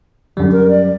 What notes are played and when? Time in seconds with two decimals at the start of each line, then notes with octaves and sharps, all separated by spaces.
0.37 F#2 D3 G3
0.52 A#4
0.68 D5